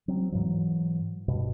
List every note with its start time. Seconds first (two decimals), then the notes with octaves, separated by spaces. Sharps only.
0.08 F#3 C4
0.32 G#2 E3 F#3
1.28 G2 B2